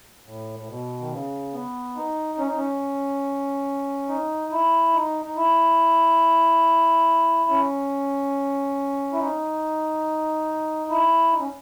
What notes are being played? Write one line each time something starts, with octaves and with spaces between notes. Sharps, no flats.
A2
A2
B2
D#3
C#3
B3
D#4
C#4
D#4
C#4
D#4
E4
D#4
D#4
E4
C#4
E4
D#4
E4
D#4
C#4